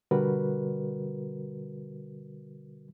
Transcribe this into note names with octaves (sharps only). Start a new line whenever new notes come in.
B2 D3 G3 F#4 A#4 B4